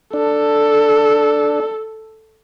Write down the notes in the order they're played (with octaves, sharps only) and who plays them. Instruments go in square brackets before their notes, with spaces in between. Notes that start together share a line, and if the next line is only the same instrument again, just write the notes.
[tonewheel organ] D4 [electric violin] A4